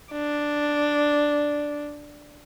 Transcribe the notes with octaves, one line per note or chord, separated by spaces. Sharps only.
D4